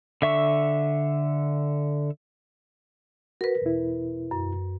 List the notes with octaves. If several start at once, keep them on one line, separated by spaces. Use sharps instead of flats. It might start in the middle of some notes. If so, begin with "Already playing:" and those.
D3 E5 C#6
F#4 A#4 B4
E2 B2 E4
F#2